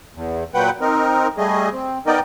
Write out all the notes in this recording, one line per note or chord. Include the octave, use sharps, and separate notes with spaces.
E2
A#2 F#3 B4 F#5 G5
C4 D#4 A#4
G3 A3 G#4 D#5
C4
B3 D#4 A#4 D5 D#5 G5